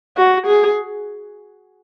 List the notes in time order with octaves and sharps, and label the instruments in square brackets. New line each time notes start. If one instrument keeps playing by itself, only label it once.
[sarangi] F#4
G#4